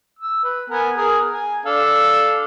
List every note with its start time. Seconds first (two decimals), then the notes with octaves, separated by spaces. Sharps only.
0.19 E6
0.44 B4
0.70 B3 A#4 G#5
0.97 G#4 A#4
1.33 G#5
1.66 D4 A4 F5